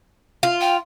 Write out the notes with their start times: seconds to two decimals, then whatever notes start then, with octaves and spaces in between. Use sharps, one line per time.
0.43 F4
0.61 G5